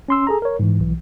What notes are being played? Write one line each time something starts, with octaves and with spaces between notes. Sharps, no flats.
C#4 C6 E6
G#4 A4 A#5
A#4 C#5
G#2 E3
B1 E3